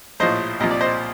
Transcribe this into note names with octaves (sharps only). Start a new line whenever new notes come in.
A#1 A2 F3 C5 D#5
C2 A#2 F3 D#5
D5
C5 D#5